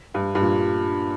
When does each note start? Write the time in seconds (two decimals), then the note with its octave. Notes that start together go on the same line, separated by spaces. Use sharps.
0.14 G2
0.35 G2
0.41 A#2